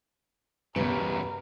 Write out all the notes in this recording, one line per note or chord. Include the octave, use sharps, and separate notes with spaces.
B1 E2 G2 C#3 A#4 B4